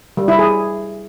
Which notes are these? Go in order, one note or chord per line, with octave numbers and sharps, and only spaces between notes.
G3
E4
G#4